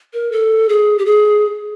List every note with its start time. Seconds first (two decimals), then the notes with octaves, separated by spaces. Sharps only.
0.13 A#4
0.32 A4
0.69 G#4
0.98 G4
1.06 G#4